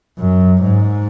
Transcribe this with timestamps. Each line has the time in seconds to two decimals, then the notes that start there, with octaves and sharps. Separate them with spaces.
0.19 F#2
0.62 G#2